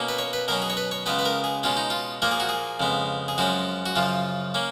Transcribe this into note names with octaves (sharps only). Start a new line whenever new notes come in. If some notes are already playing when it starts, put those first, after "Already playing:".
Already playing: B2 A#3 C#4
B4
C#5
B4
B2 F#3 C#4 A#4
G#4
C#5
B4
C#5
C#2 C#3 G#3 B3 B4
B4
A#4
G#4
B2 G#3 C#4 F4
D#4
F4
A#2 F3 A#3 A#4
G#4
F#4
G#4
F2 C#3 G#3 B3
G#4
F#2 F3 G#3 C#4 F#4
F#4
F#2 C#3 F3 F4
A#3 C#4